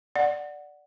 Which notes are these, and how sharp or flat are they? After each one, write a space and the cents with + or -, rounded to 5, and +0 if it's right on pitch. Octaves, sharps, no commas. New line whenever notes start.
D5 +0 F#5 +0